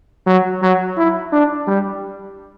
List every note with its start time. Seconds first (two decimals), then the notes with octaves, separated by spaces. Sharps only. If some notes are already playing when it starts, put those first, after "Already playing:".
0.27 F#3
0.62 F#3
0.98 E4
1.33 D4
1.68 G3